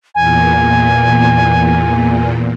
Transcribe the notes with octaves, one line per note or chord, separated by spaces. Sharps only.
E2 A#2 G#5